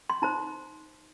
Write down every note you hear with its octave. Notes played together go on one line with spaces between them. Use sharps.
C6
D#4 C5 A#5